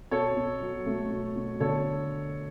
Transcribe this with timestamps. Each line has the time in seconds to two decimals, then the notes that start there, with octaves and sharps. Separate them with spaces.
0.11 B2 A4 C#5
0.36 B2
0.61 F#3
0.86 A3
1.10 B2
1.36 B2
1.60 D3 A4 C#5